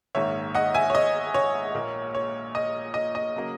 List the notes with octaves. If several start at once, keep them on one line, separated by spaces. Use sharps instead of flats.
A#1 G#2 D#3 A#3 C#5 E5
D#5 F#5
E5 G#5
C#5
D#5
C#5
A#1 A#2 A#3
C#5
D#5
D#5
D#5
C#3 F#3 A#3